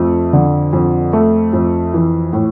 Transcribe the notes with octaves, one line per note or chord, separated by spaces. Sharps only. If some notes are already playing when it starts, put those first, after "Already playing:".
Already playing: F2 A3
D3
F2
A3
F2
E3
A2